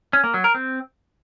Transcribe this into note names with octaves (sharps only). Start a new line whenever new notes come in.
C#4
A#3
F#3
A#4
C4